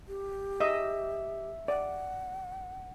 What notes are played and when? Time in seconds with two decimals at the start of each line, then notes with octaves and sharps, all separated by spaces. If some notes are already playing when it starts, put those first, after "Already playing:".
0.08 G4
0.60 D#5 E5
1.68 D5 F#5